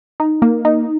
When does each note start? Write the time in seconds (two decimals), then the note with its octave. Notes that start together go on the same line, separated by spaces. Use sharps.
0.20 D#4
0.42 A#3
0.65 D#4